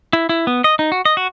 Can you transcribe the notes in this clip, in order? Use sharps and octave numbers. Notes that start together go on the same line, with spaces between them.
E4
E4
B3
D#5
D#4
F#4
D#5
F#4